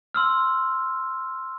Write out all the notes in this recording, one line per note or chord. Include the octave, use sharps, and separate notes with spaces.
C6 E6 F6